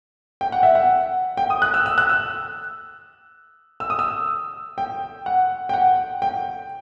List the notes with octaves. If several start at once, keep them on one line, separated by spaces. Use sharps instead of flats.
G5
F#5
E5
F#5
G5
D#6
F#6
E6
E6
F#6
E6
E6
D#6
E6
G5
F#5
G5
F#5
G5